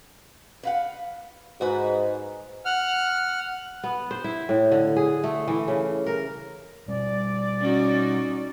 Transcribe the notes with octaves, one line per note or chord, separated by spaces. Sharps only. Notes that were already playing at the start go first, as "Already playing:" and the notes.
B4 F5 F#5
G#2 F#4 B4
F#5 F6
B3
C5
E4
A2
D3
G#4
A3
E3
C#3
A#4
B2 G3 D5
C#4 D#4 F#4